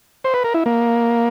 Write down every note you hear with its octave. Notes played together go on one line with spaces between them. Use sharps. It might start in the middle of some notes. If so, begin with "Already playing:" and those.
C5
B4
A#4
E4
A#3